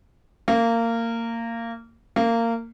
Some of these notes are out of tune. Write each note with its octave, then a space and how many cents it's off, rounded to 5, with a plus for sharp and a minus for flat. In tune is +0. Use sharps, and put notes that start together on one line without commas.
A#3 -20
A#3 -20